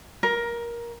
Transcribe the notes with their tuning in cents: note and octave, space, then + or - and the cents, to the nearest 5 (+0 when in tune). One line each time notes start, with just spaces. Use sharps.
A#4 +15